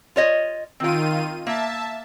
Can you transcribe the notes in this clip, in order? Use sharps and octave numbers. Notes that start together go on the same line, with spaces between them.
F4 C#5 D#5
D#3 C4 F4 G5 D#7
A#3 E5 A5